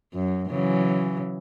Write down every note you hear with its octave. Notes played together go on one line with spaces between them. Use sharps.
F#2
C#3 E3 F#3